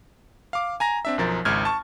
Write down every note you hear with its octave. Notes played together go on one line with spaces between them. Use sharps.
F5 D6
G#5 A#5 A#6
C4 D4 E5
B1 F#2 F3 A#4 C5 A6
G#1 C#2 F6 G#6
A5 C#6